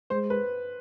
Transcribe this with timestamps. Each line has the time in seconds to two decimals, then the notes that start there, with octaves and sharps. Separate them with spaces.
0.10 G#3 C5
0.30 B4